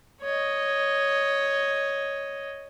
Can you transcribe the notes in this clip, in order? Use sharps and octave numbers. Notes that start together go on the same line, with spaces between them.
C#5 D#5